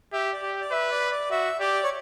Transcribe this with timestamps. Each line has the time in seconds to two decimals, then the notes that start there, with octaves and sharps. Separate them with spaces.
0.13 G4 E5
0.33 D5
0.43 G4
0.61 D5
0.72 B4 E5
0.91 D5
1.11 D5
1.31 F#4 E5
1.60 G4 D5
1.83 C#5